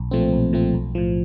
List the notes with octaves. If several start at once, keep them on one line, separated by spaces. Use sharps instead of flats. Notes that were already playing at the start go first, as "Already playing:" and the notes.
Already playing: B1
A#2 F3 A3 C4
B1
A#2 F3 A3 C4
B1
A2 F3